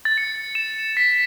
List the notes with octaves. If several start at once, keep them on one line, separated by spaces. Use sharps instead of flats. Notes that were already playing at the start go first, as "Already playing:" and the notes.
A6
C#7
E7
B6